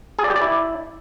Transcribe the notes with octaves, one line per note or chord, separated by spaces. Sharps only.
G#4
D5
G4
D5
E4